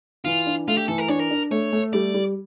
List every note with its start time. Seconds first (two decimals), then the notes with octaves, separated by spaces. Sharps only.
0.25 E3 F4
0.46 D4
0.68 A3 F4
0.77 G4
0.88 E3 A4
0.98 A#4
1.08 D4 C#5
1.19 A#4
1.31 D4
1.51 A3 C#5
1.72 A3
1.93 G3 D5
2.14 G3